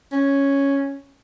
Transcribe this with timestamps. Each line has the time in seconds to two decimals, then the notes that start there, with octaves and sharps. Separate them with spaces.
0.12 C#4